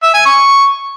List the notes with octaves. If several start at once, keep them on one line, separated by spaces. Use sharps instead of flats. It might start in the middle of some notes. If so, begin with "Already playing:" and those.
E5
G#5
C#6